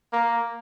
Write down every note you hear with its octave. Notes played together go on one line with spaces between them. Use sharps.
A#3